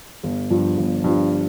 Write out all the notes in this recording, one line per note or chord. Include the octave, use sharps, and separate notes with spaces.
G1
G2 F3
G1
G2 F3